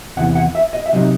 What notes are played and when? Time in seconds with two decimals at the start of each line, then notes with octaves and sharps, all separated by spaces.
0.17 E2 C3 E3 F#5
0.35 F#5
0.55 E5
0.73 D#5
0.86 E5
0.93 C3 F#3 C4 D#4 D#5